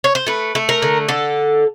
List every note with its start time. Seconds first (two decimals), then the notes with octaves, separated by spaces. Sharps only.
0.04 C#5
0.15 C5
0.26 A3 B4
0.55 A3
0.69 A#4
0.82 D3
1.09 D3 A4